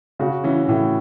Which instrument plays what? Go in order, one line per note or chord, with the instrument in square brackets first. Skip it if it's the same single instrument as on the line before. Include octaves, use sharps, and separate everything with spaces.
[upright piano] C#3 [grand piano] F#4
[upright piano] E3 [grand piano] C#4
[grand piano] A2 [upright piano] E3